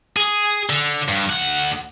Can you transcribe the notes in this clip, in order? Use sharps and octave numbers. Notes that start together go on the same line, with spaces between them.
G#4
D3
G2
D2 F#5